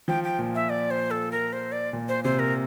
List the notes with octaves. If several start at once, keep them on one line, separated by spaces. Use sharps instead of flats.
F3 G5
G5
A#2
E5
D5
C5
A4
A#4
C5
D5
A#2
C5
C3 C5
A#4